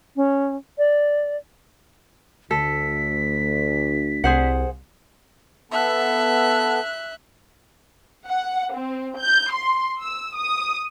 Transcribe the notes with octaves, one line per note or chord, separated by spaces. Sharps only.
C#4
D5
D2 A4 B6
C2 G#4 C5 F#5
B3 A4 E5 F#6
F#5
C4
G6
C6
E6
D#6